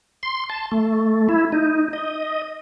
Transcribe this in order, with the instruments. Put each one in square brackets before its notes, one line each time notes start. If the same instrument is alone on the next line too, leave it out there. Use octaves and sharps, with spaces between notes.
[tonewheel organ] C6
A5
A3
E4
D#4
D#5